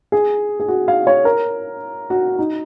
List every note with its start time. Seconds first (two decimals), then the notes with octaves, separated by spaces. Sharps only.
0.12 G#4
0.60 G#4
0.68 F#4
0.88 F5
1.07 C#5
1.25 A#4
2.10 F#4
2.39 D#4